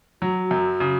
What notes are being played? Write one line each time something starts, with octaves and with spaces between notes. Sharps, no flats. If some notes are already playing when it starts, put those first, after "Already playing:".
F#3 F#4
F#2
C#3